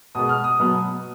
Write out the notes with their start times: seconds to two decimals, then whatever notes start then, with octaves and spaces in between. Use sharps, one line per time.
0.15 B2 G#3 B3 D#6
0.29 F6
0.44 D#6
0.59 B2 F#3 B3